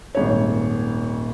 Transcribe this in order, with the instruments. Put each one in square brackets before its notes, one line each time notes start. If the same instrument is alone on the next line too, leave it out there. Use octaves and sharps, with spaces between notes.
[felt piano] D#1 G#1 C#5